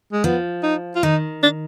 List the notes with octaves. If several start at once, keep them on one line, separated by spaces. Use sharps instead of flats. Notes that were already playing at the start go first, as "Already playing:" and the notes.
G#3
F3 B3
D#4
F4
D#3 D#4
D4